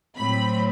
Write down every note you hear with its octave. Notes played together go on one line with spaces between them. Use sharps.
A2 F#3 C4 B5